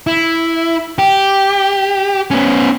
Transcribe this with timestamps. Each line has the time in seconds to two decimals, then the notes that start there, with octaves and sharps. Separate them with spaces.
0.07 E4
0.99 G4
2.31 B3 C#4